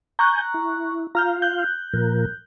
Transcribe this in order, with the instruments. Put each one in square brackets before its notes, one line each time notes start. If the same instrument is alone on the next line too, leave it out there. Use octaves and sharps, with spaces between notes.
[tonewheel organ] G#5 G6 [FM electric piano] A#5 C#6 F#6
[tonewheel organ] E4
[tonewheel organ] F4 F5 [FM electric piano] A#5 F6 G6
[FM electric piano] F#6 G6
[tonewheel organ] A#2 F3 A#4